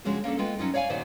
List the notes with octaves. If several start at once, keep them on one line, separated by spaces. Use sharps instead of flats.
C#3 F3 G#3 C#4 D4 F#4
A#3 C#4 D4 A4
G#3 B3 F4 A4 G5
F#3 C#4 D#4 F4
C#5 D5 F5 F#5 G#5
A#2 D#3 F#4 C5 D5